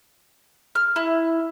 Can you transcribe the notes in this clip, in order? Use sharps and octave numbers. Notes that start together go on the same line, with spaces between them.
F6
E4